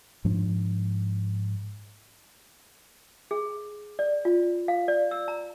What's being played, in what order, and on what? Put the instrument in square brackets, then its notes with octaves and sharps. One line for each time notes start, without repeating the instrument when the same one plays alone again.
[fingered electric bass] G#2 F3 D4
[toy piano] G#4
D5
F4
F5
D5
E6
A#5